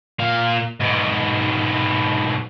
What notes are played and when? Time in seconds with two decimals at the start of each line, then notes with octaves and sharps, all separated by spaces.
0.19 A#2 F5
0.80 G#2 B2